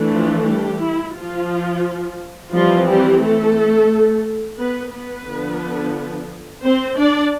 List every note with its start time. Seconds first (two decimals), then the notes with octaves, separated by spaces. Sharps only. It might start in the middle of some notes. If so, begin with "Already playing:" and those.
Already playing: E3 A3 D4
0.15 F3 F4
0.48 G3 G4
0.82 E4
1.17 F3 F4
2.53 E3 F3 G3 C4 F4
2.87 G3 G4
3.21 A3 A4
4.58 B3 B4
4.92 B3 B4
5.27 D3 F3 B3 D4
6.64 C4 C5
6.97 D4 D5